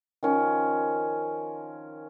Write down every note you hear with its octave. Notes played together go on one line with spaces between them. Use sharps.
D#3 F3 C#4 A#4